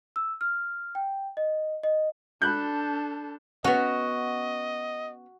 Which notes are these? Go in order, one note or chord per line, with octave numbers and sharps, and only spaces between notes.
E6
F6
G5
D#5
D#5
D4 A4 B5 F#6 G6
B3 C#4 F#4 D#5